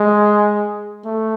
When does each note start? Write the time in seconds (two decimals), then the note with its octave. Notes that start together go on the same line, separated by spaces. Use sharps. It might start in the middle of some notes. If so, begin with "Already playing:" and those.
Already playing: G#3
1.05 A3